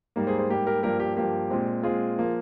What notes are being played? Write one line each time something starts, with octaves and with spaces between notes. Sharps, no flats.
G#2 G3 A#3
G#4 C5
G#4 C5
G#2 G3 A#3 G4
G4 A#4
G2 F3 A#3 G4 A#4
G4
G2 F3 A#3 G4
A#2 G#3 C4
A#2 G#3 C4 F4 G#4
F3 A#3